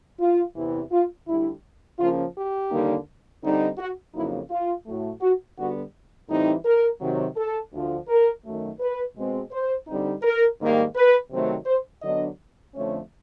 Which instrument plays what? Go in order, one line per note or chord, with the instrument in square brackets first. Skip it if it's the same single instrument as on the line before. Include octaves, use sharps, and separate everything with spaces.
[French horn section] F4
E2 C3 E3
F4
D2 D3 G3 E4
C#3 F3 A#3 C#4 F4
G4
D#2 D3 G3 A#3 D#4
D3 G3 C4 D#4
F#4
F2 C#3 F#3 A#3 D#4 E4
F4
A2 F#3 A3
F#4
D3 G3 B3 F#4
A2 E3 G3 C4 D#4
A#4
C3 D#3 F#3
A4
D2 D3 F3
A#4
F#2 D#3 F#3 A3
B4
B2 G#3 C4
C5
D3 G3 C4 D#4
A#4
G#2 D#3 G3 A#3
B4
C3 D#3 F#3 A3 C4
C5
D3 F#3 B3 D4 D#5
F2 D3 F3 A3 C#4 C#5